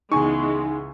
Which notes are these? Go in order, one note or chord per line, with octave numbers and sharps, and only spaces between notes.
C#2 E3 G#3 B3 D#4 G#5 C#6